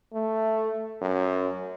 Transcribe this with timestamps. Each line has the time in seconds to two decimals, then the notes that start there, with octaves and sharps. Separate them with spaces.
0.14 A3
1.02 F#2